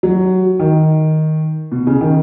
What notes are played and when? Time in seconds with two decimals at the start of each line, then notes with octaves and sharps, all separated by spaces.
0.03 F#3
0.59 D#3
1.72 B2
1.87 C#3
2.01 D#3